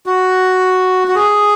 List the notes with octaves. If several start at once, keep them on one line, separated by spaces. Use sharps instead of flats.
F#4
F#4
G#4